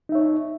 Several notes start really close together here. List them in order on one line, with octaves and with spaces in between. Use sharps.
D#4 E5 C#5